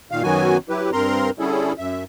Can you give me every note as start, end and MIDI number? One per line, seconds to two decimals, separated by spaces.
0.11 0.23 46
0.11 0.23 51
0.11 0.23 77
0.23 0.57 42
0.23 0.57 51
0.23 0.57 54
0.23 0.57 59
0.23 0.57 66
0.23 0.57 80
0.69 0.90 54
0.69 0.90 64
0.69 0.90 67
0.69 0.90 71
0.93 1.30 43
0.93 1.30 60
0.93 1.30 70
0.93 1.30 82
0.93 1.30 84
1.39 1.73 50
1.39 1.73 55
1.39 1.73 61
1.39 1.73 64
1.39 1.73 68
1.39 1.73 69
1.78 2.04 42
1.78 2.04 76